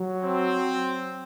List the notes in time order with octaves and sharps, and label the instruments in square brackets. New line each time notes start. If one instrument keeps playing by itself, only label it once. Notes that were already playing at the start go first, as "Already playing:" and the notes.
Already playing: [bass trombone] F#3
[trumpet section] C4